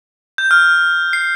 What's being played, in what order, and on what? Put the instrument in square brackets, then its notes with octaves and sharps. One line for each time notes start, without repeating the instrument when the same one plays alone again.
[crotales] G6
F6
C7